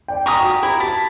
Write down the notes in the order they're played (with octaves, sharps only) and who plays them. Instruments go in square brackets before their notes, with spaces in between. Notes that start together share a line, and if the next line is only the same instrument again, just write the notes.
[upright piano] D5 G5
[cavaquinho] G4 G#5 A#5 [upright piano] C#6 D#6
[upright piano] F#4
[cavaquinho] E4 A#4 [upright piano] G4
[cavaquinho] A5 [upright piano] B6